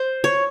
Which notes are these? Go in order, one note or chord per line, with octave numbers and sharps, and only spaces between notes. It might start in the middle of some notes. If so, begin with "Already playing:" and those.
Already playing: C5
C#5